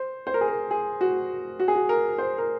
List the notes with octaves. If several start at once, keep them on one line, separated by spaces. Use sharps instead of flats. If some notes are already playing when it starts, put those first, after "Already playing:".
Already playing: C5
C5
A#4
G#4
A#4
G#4
F#4
F#4
G#4
F#4
A#4
C5
A#4